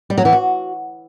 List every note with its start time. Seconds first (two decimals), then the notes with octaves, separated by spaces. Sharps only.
0.10 G3
0.18 F#3
0.25 E3
0.33 F#4